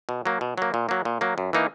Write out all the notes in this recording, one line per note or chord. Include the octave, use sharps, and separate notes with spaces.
B2
F#3 A#3
B2
F#3 A#3
A#2
F#3 A#3
A#2
F#3 A#3
F#2
E3 A#3 D#4